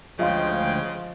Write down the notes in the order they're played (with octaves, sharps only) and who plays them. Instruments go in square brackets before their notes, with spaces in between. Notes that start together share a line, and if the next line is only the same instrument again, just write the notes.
[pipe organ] D2 G#3 G5 [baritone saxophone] C#3 [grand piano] F3 [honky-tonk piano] D#5 F5 C6